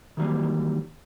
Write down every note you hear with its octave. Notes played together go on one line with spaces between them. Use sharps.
D#3 E3 F#3 G3 A#3